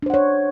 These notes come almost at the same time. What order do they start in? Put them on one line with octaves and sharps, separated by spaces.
D4 C5 F#5 C#5